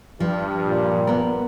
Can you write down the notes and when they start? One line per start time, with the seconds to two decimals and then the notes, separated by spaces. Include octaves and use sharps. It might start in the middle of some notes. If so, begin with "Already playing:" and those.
0.20 G2 F3
0.61 A#2
1.07 B3 A#4